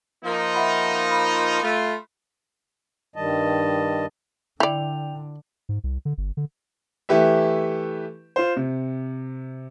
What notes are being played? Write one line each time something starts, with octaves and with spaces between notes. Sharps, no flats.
F3 A#3 D#4
E5 F#5 B5
B5
A3 F4
G2 D#3 G3 D#5 A5
D3 E4 D5 G5 G6 F7
G#2
C2
D3
G1
D3
E3 A3 E4 G4 B4 E5
F4 C5
C3